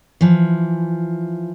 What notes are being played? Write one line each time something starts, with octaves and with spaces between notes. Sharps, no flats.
E3 F3